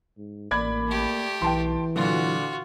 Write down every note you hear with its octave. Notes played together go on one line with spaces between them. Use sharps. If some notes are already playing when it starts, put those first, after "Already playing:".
G#2
A1 A#3 D5 B5 G#6
A3 G4
B1 E3 G5 A5 C6
A#2 D3 F#3 F4 F#4